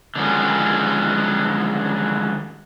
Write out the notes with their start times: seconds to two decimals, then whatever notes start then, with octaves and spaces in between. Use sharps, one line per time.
0.16 D3 D#3 F3 F#3 G#3 C#4